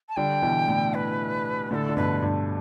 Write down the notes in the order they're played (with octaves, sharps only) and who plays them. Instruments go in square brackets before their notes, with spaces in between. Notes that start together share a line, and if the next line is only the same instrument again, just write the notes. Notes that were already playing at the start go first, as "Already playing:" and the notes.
[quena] A5
[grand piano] D3 G3 [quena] G5
[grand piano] B2 E3
A2 D3
[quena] B4
[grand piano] A2 D3 [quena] A4 B4
[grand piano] D3
[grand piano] G2 B2 [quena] B4
[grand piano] G2